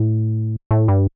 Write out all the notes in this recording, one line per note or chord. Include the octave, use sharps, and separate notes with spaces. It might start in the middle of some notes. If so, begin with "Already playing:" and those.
Already playing: A2
A2
G2